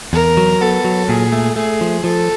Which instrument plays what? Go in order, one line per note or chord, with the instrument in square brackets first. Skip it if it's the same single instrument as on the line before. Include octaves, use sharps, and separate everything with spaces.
[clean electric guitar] E2 [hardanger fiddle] A#4
[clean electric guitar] F#3
[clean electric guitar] B3 [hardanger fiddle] A4
[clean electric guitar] F#3
[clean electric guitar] A#2 [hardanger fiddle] G#4
[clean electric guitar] A3
[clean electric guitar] A3 [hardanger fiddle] G#4
[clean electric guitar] F3
[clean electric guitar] F3 [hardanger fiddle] A4